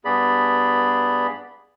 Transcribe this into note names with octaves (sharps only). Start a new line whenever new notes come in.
G2 B3 G#4 D5 B5